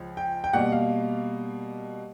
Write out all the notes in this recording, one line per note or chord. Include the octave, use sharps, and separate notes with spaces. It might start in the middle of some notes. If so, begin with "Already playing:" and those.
Already playing: C#2 F3
G5
G5
B2 G3 A#3 F#5
F5